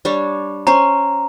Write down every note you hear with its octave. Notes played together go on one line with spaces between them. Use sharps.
G3 D4 C#5
C#4 C5 A#5